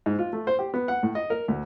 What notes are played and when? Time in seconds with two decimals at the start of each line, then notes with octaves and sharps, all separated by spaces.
0.06 G#2
0.19 F4
0.33 A3
0.47 C5
0.59 G4
0.74 B3
0.88 F#5
1.03 A2
1.15 D#5
1.30 A#4
1.48 D2